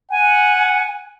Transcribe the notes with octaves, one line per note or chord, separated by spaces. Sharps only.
F#5 G#5